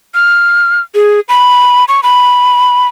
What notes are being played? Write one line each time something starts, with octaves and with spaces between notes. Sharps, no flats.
F6
G#4
B5
C#6
B5